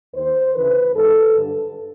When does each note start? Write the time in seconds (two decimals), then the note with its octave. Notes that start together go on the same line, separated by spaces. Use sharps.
0.14 D#2 D#3 C5
0.54 D2 C#3 E3 B4
0.94 G#2 E3 A4
1.34 G2 D3